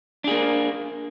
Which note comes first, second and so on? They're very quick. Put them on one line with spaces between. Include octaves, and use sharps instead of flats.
D4 G#4 A#3